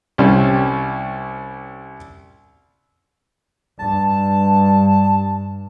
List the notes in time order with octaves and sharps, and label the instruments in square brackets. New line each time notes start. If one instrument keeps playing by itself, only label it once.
[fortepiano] C2 G3 C#4
[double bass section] G2 [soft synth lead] A5